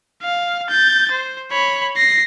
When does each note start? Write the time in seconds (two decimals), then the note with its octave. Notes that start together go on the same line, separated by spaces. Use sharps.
0.22 F5
0.70 G6 A6
1.11 C5
1.51 C#5 B5
1.96 A#6 C7